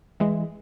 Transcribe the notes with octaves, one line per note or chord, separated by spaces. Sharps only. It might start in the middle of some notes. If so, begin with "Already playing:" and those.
E3 G#3